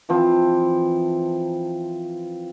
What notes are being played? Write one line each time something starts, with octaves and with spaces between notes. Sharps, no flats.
E3 F3 C4